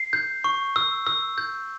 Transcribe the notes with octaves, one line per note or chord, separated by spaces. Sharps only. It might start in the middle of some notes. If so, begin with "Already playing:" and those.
Already playing: C7
G6
C#6
E6
E6
G6